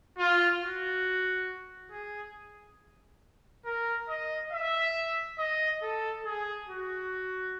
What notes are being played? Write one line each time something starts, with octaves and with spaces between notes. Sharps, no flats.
F4
F#4
G#4
A#4
D#5
E5
D#5
A4
G#4
F#4